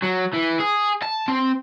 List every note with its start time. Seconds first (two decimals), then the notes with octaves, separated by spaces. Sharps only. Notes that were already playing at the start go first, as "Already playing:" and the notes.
0.03 F#3
0.34 E3
0.60 G#4
1.02 A5
1.28 C4